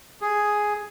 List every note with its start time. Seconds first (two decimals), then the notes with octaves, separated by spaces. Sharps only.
0.21 G#4